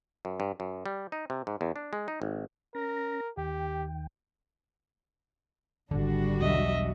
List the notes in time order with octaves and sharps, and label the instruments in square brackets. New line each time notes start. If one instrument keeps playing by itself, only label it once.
[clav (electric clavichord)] F#2
G2
F#2
G3
D#4
C3
G#2
E2
D4
G#3
D#4
G#1
[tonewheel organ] C#4 A#6 [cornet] A#4
[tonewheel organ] D#2 D#3 G5 [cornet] G4
[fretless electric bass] D#1 G#1 [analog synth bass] D3 [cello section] G3 D4 F#4
[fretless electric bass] B1 E2 [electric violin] D#5 E5